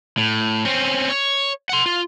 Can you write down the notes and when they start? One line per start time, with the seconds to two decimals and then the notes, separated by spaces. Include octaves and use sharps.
0.18 A2
0.65 C4 C#4
1.10 C#5
1.69 F#5 C6
1.86 F4